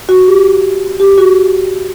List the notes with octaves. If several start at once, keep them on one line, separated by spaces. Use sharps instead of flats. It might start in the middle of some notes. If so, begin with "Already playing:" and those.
F#4
G4
G4
F#4